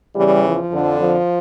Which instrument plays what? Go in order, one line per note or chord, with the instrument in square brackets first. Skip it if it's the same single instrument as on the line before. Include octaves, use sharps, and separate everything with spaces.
[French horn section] E2 C#3 E3 G3
F3
F2 D3
F3